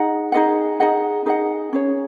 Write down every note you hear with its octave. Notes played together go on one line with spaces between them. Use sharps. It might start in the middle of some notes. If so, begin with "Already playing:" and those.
Already playing: D#4 G#4 D#5 F#5
D#4 G#4 D#5 F#5
D#4 G#4 D#5 F#5
D#4 G#4 D#5 F#5
C#4 G#4 C#5